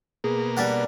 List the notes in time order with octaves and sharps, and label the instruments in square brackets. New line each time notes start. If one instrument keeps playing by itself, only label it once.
[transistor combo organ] B2 A#3 [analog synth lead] G#4
[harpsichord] G3 D4 F#5